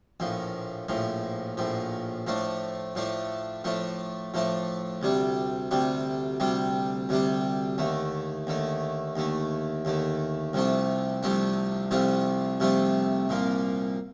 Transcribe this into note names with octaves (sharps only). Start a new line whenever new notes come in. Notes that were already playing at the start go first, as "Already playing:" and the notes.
A#1 A2 F3
A#1 A2 F3
A#1 A2 F3
A2 F3 A3 D4
A2 F3 A3 D4
A2 F3 A3 D4
A2 F3 A3 D4
D2 C3 G3 D4
D2 C3 G3 D4
D2 C3 G3 D4
D2 C3 G3 D4
D#2 D3 A3
D#2 D3 A3
D#2 D3 A3
D#2 D3 A3
C2 C3 F3 A3 D4
C2 C3 F3 A3 D4
C2 C3 F3 A3 D4
C2 C3 F3 A3 D4
C2 A#2 F3 A#3